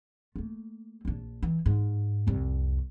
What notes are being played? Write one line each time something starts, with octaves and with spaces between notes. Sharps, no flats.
A3 A#3
A#1 D4
E3
G#2
C2 F2